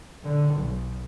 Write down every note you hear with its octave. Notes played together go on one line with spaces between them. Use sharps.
D3
B1